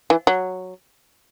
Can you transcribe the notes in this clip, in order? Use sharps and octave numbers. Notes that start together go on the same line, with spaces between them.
E3
F#3